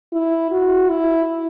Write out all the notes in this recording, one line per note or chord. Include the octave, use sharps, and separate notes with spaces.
E4
F#4
E4